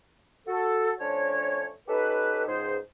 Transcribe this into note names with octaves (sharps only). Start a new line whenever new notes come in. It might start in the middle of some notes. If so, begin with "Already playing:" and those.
F#4 A4
F3 A3 C#4 D4 C#5
C#4 D#4 G4 A4 B4
C#2 G#2 G#4 C5